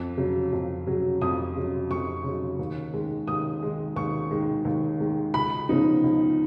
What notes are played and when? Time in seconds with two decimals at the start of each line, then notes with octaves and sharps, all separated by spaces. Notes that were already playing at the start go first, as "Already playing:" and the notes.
Already playing: F2
0.17 C#3 F#3
0.53 F2
0.87 C#3 F#3
1.22 F2 D#6
1.56 C#3 F#3
1.91 F2 C#6
2.24 C#3 F#3
2.59 D#2
2.94 D#3 G#3
3.28 D#2 D#6
3.62 D#3 G#3
3.96 D#2 C#6
4.31 D#3 G#3
4.65 D#2
5.00 D#3 G#3
5.34 C#2 B5
5.69 C#3 F3 B3 D#4
6.04 C#2